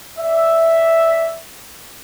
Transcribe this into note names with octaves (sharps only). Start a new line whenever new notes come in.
D5 E5